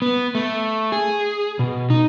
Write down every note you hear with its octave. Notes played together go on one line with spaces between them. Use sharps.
B3
A3
G#4
B2
D#4